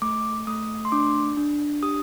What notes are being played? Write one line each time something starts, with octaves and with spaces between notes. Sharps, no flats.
A3 D6
A3 D#6
C6
D4 D6
D4
G4 D#6